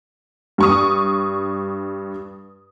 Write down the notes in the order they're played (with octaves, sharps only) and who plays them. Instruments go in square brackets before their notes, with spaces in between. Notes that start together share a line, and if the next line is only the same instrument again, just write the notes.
[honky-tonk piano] G2 C#6 D#6